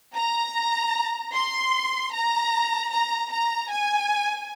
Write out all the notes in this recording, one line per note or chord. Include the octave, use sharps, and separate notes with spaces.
A#5
C6
A#5
A#5
A#5
G#5